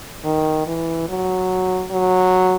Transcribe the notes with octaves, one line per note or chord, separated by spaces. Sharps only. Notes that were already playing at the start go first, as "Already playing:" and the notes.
D#3
E3
F#3
F#3